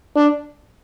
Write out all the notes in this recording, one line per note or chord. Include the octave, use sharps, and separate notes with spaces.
D4